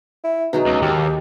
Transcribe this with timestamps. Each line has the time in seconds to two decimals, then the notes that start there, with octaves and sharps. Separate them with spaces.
0.24 E4
0.53 B2 F#3 G#3 D#4
0.66 C#2
0.82 D#2 G4